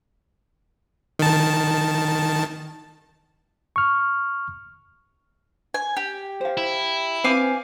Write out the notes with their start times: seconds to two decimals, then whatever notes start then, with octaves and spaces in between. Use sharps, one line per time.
1.19 D#3 A5
3.76 C#6 F6
5.74 G#5
5.97 G4
6.41 C5 F5
6.57 E4
7.24 C4 B4 F5 G#5 D6